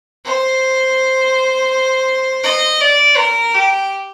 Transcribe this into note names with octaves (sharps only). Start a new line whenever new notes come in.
C5
D#5
D5
A#4
G4